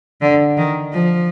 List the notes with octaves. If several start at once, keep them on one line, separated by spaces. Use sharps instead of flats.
D3
D#3
F3